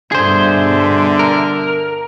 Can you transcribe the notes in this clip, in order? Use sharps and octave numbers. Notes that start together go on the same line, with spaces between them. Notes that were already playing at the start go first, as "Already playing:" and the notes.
G2 B2 D3 G#4 C5 E5
A#4